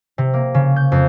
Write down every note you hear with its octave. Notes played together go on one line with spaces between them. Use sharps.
C3
A#3
C#3
G6
F2